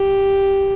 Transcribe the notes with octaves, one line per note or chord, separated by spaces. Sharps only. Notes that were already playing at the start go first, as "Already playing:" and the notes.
Already playing: G4